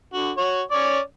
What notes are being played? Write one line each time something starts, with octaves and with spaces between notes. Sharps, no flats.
D3 F#4
F#4 C#5
C#4 C#5 D5